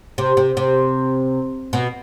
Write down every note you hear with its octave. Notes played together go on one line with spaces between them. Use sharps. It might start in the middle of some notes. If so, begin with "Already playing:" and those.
C3
C3
C3
B2